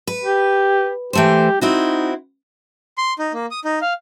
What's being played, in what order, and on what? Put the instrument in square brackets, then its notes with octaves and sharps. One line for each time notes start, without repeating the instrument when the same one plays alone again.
[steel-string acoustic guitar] B4
[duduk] G4
[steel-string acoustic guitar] E3 A3 C5 [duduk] G4
[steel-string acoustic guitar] C4 E4 F#4 [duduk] D#4
[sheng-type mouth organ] C6
D#4
A#3
D#6
D#4
F5